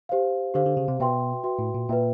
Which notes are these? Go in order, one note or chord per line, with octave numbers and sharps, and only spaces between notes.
G4 C5 F5
D3 G4 C5 F5
D3
C#3
C3
B2 F#4 B4 E5 G5 C6
F#4 B4 E5 G5 C6
A2
A#2
A#2 B4 E5 G5